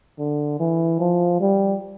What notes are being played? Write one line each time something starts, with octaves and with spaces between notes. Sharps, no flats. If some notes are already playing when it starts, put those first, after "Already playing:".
D3
E3
F3
G3